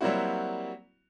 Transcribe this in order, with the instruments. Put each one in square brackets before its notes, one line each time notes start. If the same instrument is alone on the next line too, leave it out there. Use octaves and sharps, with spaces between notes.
[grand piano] F#3 G3 A#3 C4 E4 F#4